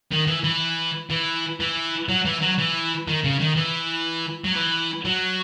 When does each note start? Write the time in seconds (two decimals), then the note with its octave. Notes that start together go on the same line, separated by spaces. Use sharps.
0.12 D#3
0.27 E3
0.44 E3
1.10 E3
1.60 E3
2.09 F#3
2.25 E3
2.41 F#3
2.58 E3
3.08 D#3
3.24 C#3
3.40 D#3
3.57 E3
4.44 F#3
4.55 E3
5.05 F#3